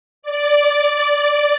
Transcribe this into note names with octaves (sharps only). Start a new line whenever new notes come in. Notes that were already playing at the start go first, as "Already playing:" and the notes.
D5